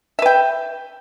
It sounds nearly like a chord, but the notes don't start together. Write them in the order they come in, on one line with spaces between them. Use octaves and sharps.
E5 B4 G5